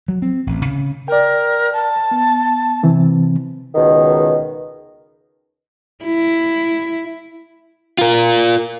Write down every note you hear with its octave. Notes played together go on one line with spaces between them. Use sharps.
F#3
C4
A1
C#3
A#4 D5 G5
A5
B3
C3 E3 C4
C#2 B2 D#3
E4
F4 A#4